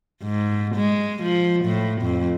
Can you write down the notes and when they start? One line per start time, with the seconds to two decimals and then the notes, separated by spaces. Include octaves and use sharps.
0.23 G#2
0.75 G#3
1.23 F3
1.65 A2
2.02 F2